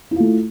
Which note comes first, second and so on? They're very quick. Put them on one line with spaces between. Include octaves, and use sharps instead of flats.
E4 F4 A3